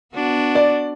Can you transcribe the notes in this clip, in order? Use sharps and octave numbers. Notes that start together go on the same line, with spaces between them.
B3 D4 F#4
D5